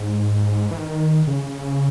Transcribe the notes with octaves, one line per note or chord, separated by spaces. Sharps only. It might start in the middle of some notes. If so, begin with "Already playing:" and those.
Already playing: G#2
E3
D#3
C#3